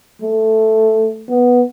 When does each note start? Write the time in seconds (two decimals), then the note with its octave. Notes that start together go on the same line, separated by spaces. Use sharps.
0.22 A3
1.28 B3